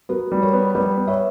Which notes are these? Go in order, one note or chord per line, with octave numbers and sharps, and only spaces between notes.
B3 F#4 A#4
G3
A#4 C#5
B3
G3 B4 D5
B3
C#5 E5